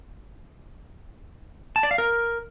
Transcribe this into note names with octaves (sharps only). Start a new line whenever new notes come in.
A5
D5
F5
A#4